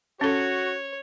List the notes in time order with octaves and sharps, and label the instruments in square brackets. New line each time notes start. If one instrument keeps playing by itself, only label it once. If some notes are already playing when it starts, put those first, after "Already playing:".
[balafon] C#4 A4 [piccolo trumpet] F#4 [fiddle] C#5